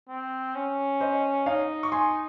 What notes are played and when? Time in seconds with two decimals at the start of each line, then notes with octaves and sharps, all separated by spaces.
0.09 C4
0.55 C#4
1.01 C5 D#5
1.46 D#4 C#5 F5
1.83 C#6
1.92 G#5 C6